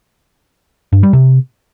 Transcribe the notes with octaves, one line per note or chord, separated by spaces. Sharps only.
G2
G3
C3